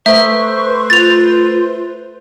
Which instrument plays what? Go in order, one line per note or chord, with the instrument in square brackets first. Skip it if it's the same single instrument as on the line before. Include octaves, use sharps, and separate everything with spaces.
[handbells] A3 A4 [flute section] B4 C5 [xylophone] E5 [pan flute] C#6
[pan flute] F4 [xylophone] A6 F7